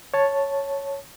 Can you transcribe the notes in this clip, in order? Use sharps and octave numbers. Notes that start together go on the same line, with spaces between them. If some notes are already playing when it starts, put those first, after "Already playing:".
C#5 A5